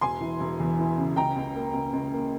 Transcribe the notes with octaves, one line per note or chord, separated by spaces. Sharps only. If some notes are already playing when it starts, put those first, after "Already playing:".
E1 G#5 C6
E3
E1
E2
E3
C#3
C#2 G5 A#5
C#2
A#3
C#2
C#2
A#3